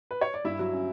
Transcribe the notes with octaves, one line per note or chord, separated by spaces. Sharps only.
B4
C#5
D5
G2 E4 E5
F#3
C#4